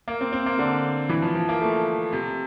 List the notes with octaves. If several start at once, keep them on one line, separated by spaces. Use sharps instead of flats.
A#3
C4
C4
A#3
D3
E3
F3
F3
A#3
A3
C3